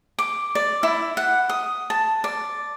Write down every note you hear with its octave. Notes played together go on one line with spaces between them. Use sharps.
D6
D5
E4
F#5
D#6
A5
D5